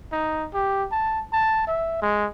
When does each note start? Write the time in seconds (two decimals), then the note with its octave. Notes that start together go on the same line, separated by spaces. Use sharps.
0.12 D#4
0.54 G4
0.91 A5
1.33 A5
1.67 E5
2.02 G#3